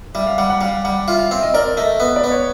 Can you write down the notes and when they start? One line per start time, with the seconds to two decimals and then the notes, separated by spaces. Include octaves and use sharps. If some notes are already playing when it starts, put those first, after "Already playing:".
0.15 G3 E5
0.27 F5
0.38 G3 F#5
0.49 F#5
0.61 G3 F5
0.84 G3 F#5
1.08 F4 E5
1.19 F5
1.31 C4 E5
1.42 D#5
1.54 A#4 D5
1.77 A3 D#5
2.00 B3 D#5
2.16 D5
2.24 B3
2.31 C#5